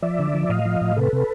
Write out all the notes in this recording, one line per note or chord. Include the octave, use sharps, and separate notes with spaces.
F3 D5 E5
D3
F3
A2 D#5 F5
F3
A2
C3 A4 B4
C3